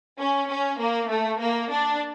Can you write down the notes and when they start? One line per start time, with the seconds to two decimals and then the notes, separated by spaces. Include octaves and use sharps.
0.20 C#4
0.50 C#4
0.80 A#3
1.10 A3
1.40 A#3
1.71 D4